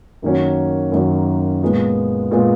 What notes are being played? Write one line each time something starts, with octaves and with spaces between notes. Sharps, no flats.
F#2 D#3 A#3 C#4 F#4
F#2 D#3 A#3 C#4 F#4
A#2 G#3 B3 F4
A#2 G#3 B3 F4